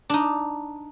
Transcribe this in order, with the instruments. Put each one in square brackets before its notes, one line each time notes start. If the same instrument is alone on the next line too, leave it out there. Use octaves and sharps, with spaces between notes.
[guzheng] D4 D#4